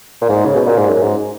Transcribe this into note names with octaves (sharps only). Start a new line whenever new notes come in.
A#2
G#2
C#3
B2
A#2
G#2
F#2
G#2